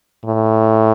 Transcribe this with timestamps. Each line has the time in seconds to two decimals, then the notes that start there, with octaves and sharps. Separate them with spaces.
0.25 A2